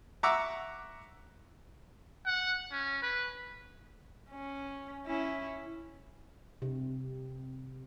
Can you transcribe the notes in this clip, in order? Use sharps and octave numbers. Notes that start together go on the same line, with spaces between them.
E5 F#5 A#5 C#6 D6 E6
F#5
C#4
B4
C#4
C#4 E4
C3